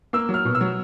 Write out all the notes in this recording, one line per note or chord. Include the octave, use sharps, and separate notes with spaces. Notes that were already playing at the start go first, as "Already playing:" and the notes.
A#3 E6
F#3
F6
B2
E6
F#3